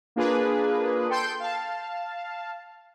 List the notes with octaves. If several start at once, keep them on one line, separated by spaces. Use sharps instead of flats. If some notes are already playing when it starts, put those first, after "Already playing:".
A#3 D4 F4 G#4 B4
A4 G5 C6 G6
F5 A5